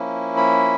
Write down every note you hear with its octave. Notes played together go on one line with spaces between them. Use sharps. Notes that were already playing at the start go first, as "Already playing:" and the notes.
Already playing: F3 A#3 C#4 E4
B5